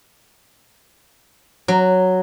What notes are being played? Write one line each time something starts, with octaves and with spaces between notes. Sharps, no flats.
F#3